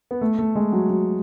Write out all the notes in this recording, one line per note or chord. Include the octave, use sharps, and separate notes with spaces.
B3
A3
A3
G#3
F#3
F#3